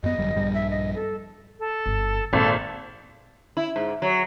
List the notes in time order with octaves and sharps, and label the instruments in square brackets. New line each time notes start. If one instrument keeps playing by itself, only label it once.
[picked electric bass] F#2 B3 [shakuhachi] D#5
[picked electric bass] G1 F#2 G3
A#1 G2 G3
[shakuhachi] E5
D#5
A4
[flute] A4
[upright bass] G1
[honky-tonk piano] G#1 [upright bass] A#2 [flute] A4
[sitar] E4
G#2
F#3